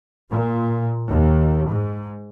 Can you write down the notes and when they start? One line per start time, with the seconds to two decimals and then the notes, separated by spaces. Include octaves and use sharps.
0.30 A#2
1.08 D#2
1.71 G#2